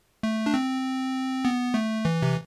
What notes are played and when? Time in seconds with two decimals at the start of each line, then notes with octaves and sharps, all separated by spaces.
0.23 A3
0.46 D4
0.54 C4
1.45 B3
1.74 A3
2.05 E3
2.22 C3